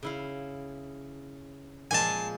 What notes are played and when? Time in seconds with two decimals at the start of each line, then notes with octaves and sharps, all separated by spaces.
0.03 C#3 E4 F5
1.91 A#2 F3 G#3 G#5 A5